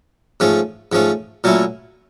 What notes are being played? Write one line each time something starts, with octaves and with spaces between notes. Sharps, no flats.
G#2 F3 A3 C#4
G#2 F3 A3 C#4
A#2 F#3 A3 C#4 E4